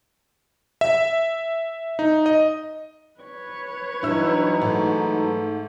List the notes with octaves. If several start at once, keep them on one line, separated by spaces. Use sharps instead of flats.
E5
D#4
D#5
B4 C#5
G2 E3 F#3 D#4 E4 E6
G#2 A3